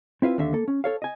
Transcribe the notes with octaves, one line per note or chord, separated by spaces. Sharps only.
C4 E4 F4 B4 E5
D#2 D3 E5
A#3 A4
C#4
A4 C#5 F5
D#5 G#5